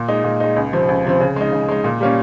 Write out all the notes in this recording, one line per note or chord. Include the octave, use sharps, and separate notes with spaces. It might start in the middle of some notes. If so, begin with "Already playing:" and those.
Already playing: A#2
G#3 D#4
A#2
G#3 D#4
C#2
C3 F3 C4
C#2
C3 F3 C4
C#3
G#3 D#4
C#3
G#3 D#4
A#2
G3 A#3 C#4